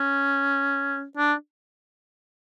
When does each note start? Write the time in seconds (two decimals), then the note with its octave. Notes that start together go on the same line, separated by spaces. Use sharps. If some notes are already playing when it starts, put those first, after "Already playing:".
Already playing: C#4
1.17 D4